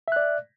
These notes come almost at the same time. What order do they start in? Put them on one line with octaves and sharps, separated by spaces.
E5 F#6 D5